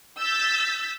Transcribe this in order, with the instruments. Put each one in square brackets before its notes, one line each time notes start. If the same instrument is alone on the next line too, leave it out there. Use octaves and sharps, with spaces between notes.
[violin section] E6 G6 A6 B6